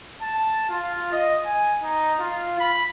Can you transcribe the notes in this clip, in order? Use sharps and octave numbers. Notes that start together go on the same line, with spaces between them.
A5
F4
D#5
G#5
D#4
F4
B5